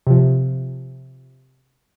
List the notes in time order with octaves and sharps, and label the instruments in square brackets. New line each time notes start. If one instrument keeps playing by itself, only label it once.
[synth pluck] C3 F3